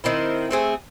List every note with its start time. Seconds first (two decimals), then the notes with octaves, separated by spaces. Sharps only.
0.04 D#3 C4 E4
0.51 A3 C4 G#4